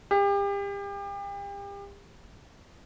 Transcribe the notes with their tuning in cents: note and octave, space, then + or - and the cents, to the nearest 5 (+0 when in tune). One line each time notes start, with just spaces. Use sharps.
G4 +35